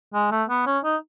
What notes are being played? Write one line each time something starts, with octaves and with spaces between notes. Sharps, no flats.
G#3
A3
B3
C#4
D#4